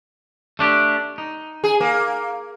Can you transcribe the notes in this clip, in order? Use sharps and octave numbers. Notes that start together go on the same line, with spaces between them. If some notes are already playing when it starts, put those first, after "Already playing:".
A3 D4 G4
D#4
G#4
A#3